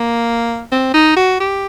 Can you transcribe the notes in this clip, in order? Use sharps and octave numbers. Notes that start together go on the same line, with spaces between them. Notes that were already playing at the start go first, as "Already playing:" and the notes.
Already playing: A#3
C4
D#4
F#4
G4